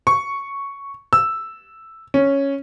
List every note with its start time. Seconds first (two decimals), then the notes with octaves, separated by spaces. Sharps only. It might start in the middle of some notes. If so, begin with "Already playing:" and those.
0.07 C#6
1.13 E6
2.14 C#4